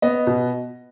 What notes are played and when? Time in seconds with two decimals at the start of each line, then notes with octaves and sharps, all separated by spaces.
0.02 B3 D#5
0.27 B2